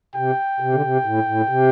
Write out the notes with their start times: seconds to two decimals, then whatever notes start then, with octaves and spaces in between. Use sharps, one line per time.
0.15 C3 G5
0.60 C3
0.73 D3
0.82 C3
1.04 A2
1.26 A2
1.48 C3